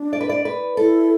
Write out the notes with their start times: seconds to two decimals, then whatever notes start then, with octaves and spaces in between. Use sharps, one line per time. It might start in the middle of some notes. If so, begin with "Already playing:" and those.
Already playing: D4
0.13 D5
0.21 B4
0.29 D5
0.45 B4
0.77 E4 A4